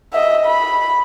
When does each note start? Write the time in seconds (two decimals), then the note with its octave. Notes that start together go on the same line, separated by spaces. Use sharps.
0.13 D#5 E5
0.46 B5